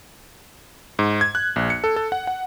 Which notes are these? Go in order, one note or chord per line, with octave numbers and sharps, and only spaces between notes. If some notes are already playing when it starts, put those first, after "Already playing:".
G#2
G#6
F#6
A#1
C#7
A4
A4
F#5
F#5